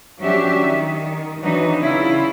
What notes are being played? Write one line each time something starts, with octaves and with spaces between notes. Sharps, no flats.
F3 F#3 C#4 D4 G4 E5
D#3
E3 F#3 D4 D#4 B4
C#3 E4 F4